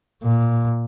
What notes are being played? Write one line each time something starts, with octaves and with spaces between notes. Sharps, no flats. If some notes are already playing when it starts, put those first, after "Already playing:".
A#2